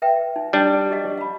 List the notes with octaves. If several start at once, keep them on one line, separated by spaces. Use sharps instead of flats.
B4 E5 G5
D#4
G3 D4
G4 D#5 F5
F5 B5